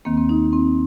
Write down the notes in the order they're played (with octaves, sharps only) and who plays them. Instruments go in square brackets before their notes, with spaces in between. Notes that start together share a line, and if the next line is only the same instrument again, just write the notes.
[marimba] D#2 D#3 A#3 C4
C4
D#4
C4